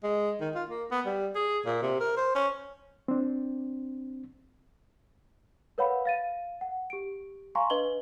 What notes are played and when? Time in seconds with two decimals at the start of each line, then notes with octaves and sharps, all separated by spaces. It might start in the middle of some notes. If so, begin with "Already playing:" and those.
0.04 G#3
0.41 D#3
0.55 F4
0.69 A#3
0.91 B3
1.06 G3
1.35 G#4
1.65 A#2
1.82 C3
2.00 A#4
2.17 C5
2.35 C#4
3.08 C4 D4
5.78 A#4 B4 C#5 F5 F#5 B5
6.05 F5 A6 D#7
6.61 F#5
6.90 G4 D7
7.55 F5 G#5 A#5 C6 C#6
7.70 D4 B4 D#5 F#7 G7